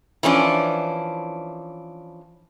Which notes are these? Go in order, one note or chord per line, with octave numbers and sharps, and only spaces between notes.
E3 F3 C#4 D4